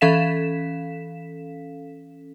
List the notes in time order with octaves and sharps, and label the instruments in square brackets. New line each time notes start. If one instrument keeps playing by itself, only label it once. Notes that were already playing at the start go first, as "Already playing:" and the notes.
[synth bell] E3 C#4 A4 F5 B6 E7